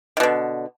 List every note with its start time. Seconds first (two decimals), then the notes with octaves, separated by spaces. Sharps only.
0.17 D#3
0.20 B2
0.23 D3